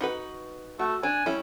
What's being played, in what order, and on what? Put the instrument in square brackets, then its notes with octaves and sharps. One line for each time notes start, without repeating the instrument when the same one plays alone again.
[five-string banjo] D#4 F#4 B4
[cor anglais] A3 [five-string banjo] F#4
[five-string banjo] D4 [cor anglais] G#5
[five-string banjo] G3 C#4 E4